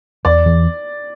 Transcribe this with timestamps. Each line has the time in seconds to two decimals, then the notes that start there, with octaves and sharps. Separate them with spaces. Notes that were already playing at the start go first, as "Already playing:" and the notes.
0.25 E2 D5
0.46 E2